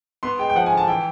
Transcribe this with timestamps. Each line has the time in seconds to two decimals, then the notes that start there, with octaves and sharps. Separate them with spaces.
0.23 B3 C6
0.39 G#3 G5
0.50 G5
0.55 F3 F#5
0.66 G#5
0.72 D3
0.77 A5
0.88 E3 G5